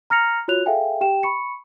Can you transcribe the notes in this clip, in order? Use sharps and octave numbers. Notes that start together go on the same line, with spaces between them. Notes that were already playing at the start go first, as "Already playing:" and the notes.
A#5 F6 A#6 C#7 F7
F4 F#4 C#5 F#6 F7
G#4 A4 E5 F5 G5 G#5
G4 G5 E7
B5 C#6 C#7